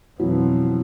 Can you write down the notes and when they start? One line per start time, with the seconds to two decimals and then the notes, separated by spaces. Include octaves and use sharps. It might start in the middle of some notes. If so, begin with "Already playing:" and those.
0.19 F2 B2 E3 F#3